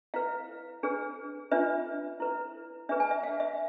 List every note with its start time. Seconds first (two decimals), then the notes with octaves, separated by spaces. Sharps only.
0.14 E4 B4 F5
0.83 D4 G#4 B4
1.51 D4 F4 B4 E5
2.20 E4 B4
2.89 D4 G#4 B4 E5
3.00 G#5
3.11 E5
3.23 F5
3.40 E5